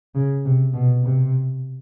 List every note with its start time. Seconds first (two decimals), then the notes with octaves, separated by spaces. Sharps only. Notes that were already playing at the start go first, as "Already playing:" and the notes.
0.15 C#3
0.46 C3
0.74 B2
1.04 C3